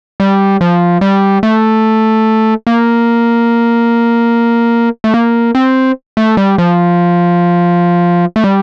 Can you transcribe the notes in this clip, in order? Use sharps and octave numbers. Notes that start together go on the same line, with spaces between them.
G3
F3
G3
A3
A#3
A3
A#3
C4
A3
G3
F3
A3
G3